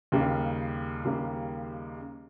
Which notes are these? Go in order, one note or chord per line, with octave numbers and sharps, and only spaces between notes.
D#2 C#3 G3 A#3
D#2 C#3 G3 A#3